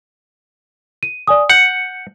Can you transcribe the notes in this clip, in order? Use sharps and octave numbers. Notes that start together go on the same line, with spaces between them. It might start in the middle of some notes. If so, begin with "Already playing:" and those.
D#7
D5 G#5 D#6
F#5 G6 C#7